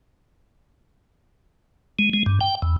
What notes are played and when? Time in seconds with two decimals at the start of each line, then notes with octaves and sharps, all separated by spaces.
1.99 G#3
2.14 G#3
2.26 G2
2.41 G5
2.62 E2